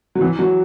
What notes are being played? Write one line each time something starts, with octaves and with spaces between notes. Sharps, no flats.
F#3
E3
F#3